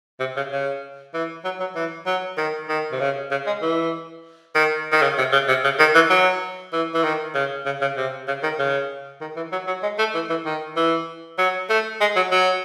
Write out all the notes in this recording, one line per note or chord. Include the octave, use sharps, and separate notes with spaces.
C3
C#3
C#3
E3
F#3
F#3
E3
F#3
D#3
D#3
C3
C#3
C#3
G#3
E3
D#3
D#3
C#3
C3
C#3
C3
C#3
D#3
E3
F#3
E3
E3
D#3
C#3
C#3
C#3
C3
C#3
D#3
C#3
D#3
E3
F#3
F#3
G#3
A3
E3
E3
D#3
E3
F#3
A3
G#3
F#3
F#3